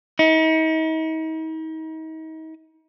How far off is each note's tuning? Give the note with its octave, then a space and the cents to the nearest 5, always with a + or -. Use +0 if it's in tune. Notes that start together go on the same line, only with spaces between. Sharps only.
D#4 +40